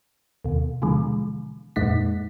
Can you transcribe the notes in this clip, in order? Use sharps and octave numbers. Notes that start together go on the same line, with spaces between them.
D#2 B2
B2 D3 E3 F3 G#3
F2 A#2 G#3 D#4 F#5 B6